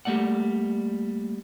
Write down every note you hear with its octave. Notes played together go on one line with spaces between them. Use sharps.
G3 A3 A#3 D5 F#5